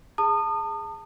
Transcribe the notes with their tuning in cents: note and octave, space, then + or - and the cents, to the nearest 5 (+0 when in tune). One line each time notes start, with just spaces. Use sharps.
G#4 -10 A5 +30 D#6 -30